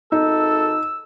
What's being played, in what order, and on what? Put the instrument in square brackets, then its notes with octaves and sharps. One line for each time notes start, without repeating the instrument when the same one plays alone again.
[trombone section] G#1 A4 [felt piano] D#4 [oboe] E6